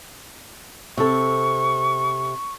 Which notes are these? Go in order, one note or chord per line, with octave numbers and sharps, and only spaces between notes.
C3 A4 C#6